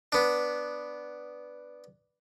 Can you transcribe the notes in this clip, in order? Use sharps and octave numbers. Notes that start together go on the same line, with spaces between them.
B3 D4